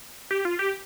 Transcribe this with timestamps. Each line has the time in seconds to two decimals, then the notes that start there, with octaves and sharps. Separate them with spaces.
0.31 G4
0.45 F4
0.59 G4